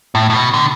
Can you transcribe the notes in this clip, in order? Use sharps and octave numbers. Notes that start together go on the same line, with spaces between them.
A2
A2
B2
D3